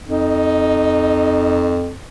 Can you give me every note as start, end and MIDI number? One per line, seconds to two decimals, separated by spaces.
0.08 1.93 41
0.08 1.80 63